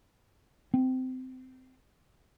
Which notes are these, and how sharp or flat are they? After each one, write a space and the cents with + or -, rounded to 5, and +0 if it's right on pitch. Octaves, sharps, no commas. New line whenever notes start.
C4 -25